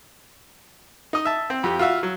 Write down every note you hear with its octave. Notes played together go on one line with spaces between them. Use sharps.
D#4 D#5
E5 A5
C4
F2 G4
F4 F#4 E5 F5
F#3